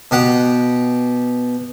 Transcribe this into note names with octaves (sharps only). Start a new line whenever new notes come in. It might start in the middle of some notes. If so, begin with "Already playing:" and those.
B2 G4 F#5